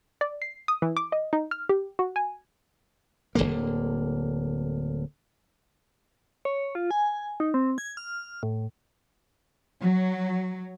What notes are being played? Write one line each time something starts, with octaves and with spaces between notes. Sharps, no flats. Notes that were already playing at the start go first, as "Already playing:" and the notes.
D5
C7
D#6
E3
D6
D#5
D#4
F6
G4
F#4
G#5
D1 C2 D3 A#3
C#5
F4
G#5
D#4
C4
G#6
F6
A2
F#3